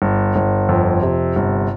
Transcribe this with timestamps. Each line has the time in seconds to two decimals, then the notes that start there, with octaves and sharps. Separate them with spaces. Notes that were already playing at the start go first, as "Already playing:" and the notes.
0.02 G1
0.36 G1
0.69 F2
1.02 C3
1.36 G1